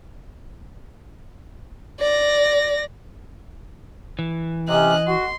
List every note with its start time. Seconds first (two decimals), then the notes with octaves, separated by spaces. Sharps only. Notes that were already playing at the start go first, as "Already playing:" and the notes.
2.00 D5 A#6
4.19 E3
4.68 C3 C#4 D#5 F#6
5.08 F#4 C6